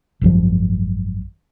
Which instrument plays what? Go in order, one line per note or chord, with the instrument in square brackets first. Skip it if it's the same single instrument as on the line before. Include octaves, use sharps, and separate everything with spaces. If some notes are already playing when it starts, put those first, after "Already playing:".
[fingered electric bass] G#1 F#2 C3 F3